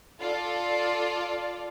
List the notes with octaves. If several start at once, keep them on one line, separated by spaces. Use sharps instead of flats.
F4 A4 D5